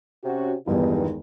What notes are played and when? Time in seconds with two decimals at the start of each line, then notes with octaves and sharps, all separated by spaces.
0.24 C3 C#4 F#4
0.68 G1 E2 G2 D#3 G#3 D#4